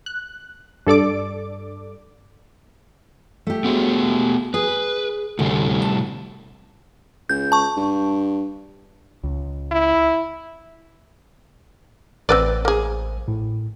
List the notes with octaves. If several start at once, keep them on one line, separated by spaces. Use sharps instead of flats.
F#6
G2 A4 D5 D6
A3 G4
B3 F#4 G#4
G#4 B4
D2 A2 C3 G3
A5
C#2 G6
A5 C#6
G2
C#2
E4
A1 C4 B4 C5 D5
A#3 G#4
A2